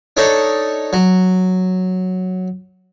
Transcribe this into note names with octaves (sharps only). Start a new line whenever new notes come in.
D4 D#4 A4 C#5
F#3